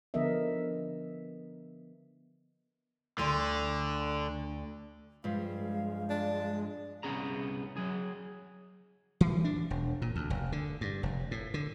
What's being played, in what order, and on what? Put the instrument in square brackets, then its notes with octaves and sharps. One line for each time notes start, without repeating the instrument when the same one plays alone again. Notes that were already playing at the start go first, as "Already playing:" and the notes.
[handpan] D3 F3 B3 A#4 D#5 E5
[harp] D2 C6 [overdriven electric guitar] D3
[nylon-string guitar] G2 F3 [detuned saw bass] G#3 [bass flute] F5
[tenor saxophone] D4
[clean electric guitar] C2 C#3 B3 C#4 G#4 A#5
F#3 G#4
[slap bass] E3
D4
E1
A#2
D2
F1
D3
G2
F1
A2
D3